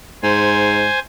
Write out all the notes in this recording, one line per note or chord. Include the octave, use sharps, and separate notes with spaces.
G#2 C5 G#5